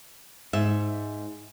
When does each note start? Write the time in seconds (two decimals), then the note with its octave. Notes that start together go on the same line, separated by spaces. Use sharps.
0.53 G#2 E5